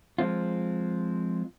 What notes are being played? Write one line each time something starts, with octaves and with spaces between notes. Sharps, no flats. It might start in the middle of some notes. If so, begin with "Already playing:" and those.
F3 G#3 C4 F4